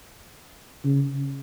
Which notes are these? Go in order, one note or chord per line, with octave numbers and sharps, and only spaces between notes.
C#3